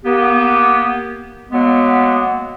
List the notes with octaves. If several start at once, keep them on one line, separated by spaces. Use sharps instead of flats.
A#3 B3 G4
F#3 G#3 A#3 B3